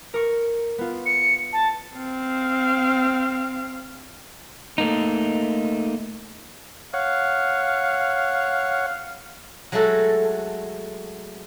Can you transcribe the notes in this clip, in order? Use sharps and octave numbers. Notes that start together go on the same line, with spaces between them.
A#4 C#6
B3 F4
C#7
A5
C4 F5
A3 A#3 D#4
C#5 F5 F#5
F#3 G#3 A3 F#4 A4